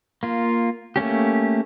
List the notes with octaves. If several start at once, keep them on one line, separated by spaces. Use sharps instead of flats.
A#3 F4
A3 A#3 C#4 G4